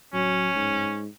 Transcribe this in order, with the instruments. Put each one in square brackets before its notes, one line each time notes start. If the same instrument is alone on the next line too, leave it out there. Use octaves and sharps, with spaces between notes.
[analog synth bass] D1 [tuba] F#3 [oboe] C#4
[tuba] G#2